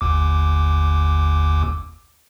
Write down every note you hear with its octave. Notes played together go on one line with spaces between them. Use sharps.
G1 D#2 D6